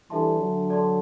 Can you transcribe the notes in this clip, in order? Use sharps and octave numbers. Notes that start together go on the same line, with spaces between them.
E3 G3 D4 A4 E5 A5 C6
D3 F#3
A4 D5 A5 C6